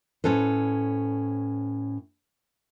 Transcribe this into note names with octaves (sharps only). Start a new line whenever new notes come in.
A2 C#4 A4 B4 C5